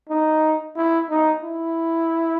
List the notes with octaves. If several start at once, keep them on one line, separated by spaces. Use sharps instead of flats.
D#4
E4
D#4
E4